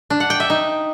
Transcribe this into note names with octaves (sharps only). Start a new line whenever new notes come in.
D4
F#5
G5
E5
D#4